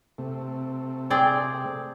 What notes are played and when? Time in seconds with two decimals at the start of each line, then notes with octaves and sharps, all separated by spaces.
0.18 C3 A3
1.10 C4 G#4 D5